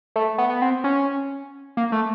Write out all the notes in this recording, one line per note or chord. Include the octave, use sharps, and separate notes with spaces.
A3
B3
B3
C4
C#4
A#3
A3